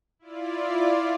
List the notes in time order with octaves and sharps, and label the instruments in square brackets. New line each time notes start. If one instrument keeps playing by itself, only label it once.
[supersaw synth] E4 F4 D5